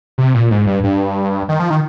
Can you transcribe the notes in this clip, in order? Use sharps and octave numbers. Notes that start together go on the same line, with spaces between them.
C3
A#2
G#2
G2
G2
D#3
F3
D#3